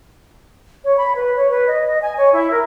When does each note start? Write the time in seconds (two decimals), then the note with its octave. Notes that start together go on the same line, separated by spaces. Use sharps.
0.84 C#5
0.98 B5
1.16 B4
1.36 C#5
1.50 B4
1.68 D#5
1.87 D#5
2.02 G#5
2.18 C#5
2.33 E4
2.51 A#4